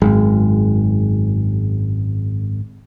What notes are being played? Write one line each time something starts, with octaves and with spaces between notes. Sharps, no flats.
G#1 F#2 G#3